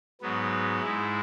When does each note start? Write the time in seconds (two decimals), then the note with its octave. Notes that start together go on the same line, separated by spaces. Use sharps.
0.21 G#2 F#3 B3
0.81 G#2 G#3 E4